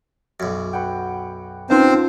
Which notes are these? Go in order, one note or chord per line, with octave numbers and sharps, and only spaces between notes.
B1 F#2
B4 F#5 G5
C4 C#4 D#4 F4 B4 C5 D#5 A5